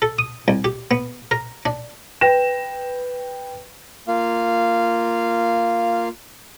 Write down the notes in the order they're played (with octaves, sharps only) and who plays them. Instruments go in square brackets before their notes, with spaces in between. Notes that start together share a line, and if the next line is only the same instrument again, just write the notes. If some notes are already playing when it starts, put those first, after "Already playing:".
[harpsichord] A4
D#6
C2
G4
B3
A#4
D4
[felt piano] B4 G5 A#6 E7
[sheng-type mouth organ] A#3 F4 F5